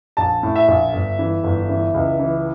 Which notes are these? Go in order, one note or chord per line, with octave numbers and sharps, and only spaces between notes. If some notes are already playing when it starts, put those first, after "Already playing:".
A#1 A5
A2
E5
A#1
G1
E3
G1
E3
C#2
E3